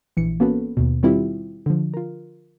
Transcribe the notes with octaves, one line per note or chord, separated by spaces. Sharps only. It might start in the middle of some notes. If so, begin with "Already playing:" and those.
A#1 E3 C#7
A#3 B3 C#4 F#4 A4 B4
D#2 B2
D#3 G3 C4 E4 F4 G4
D3 F3
F4 A#4